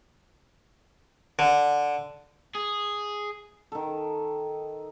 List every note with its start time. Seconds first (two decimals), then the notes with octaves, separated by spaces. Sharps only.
1.39 D3
2.55 G#4
3.72 D#3 A4